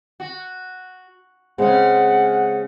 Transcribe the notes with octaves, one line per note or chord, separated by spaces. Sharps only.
F#4
C#3 G#3 C4 C#4 F#5